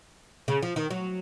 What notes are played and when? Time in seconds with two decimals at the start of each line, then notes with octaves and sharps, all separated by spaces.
0.48 C#3
0.62 F3
0.76 D#3
0.90 F#3